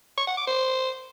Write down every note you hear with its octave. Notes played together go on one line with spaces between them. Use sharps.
C#6
F#5
D6
C5